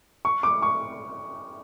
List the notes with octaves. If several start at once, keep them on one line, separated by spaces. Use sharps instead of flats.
C#6
D6
C#6